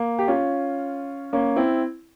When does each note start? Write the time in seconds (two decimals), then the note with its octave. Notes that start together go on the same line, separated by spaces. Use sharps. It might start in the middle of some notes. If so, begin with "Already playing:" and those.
Already playing: A#3
0.19 G4
0.28 C#4 F4
1.33 A#3 C#4
1.56 C4 E4